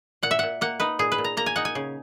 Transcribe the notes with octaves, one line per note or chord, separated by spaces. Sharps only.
A#2 F#5
E5
A#2 F#5
A#3 F#5
D#4 B4
A#2 G#4
B4
A#2
A#5
A#3 A#5
G#5
D#4 F#5
G#5
C#3